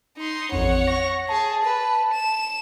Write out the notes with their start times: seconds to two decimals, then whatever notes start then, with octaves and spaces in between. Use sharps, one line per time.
0.18 D#4 C6
0.52 A1 F2 C#5 F#5
0.87 C#6 A#6
1.29 G#4 A5
1.64 B4
2.13 E7